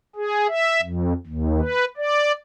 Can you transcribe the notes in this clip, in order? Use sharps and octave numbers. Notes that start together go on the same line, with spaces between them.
G#4
E5
F2
D#2
B4
D5